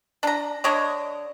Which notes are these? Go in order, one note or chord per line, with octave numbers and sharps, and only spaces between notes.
D4 A#5
D3 C#5 D#5